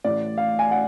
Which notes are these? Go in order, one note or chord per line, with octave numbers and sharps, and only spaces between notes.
A1 A2 D5
F5
G#5
F#5